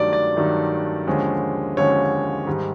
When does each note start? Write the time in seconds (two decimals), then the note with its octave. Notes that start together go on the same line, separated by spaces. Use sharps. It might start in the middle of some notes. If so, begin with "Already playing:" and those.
Already playing: G2 D#3 F#3 A3 D5
0.13 D5
0.36 G2 D#3 F#3 A3
1.07 D#2 D3 F3 G#3 C#4
1.77 D#2 D3 F3 G#3 C#4 C#5
2.46 G#2 D#3 G3